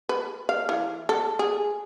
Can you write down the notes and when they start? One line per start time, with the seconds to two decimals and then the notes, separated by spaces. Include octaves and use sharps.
0.09 B4
0.49 F5
0.69 E3
1.09 A4
1.39 G#4